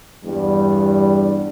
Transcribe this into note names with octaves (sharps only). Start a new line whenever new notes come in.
E2 G2 G3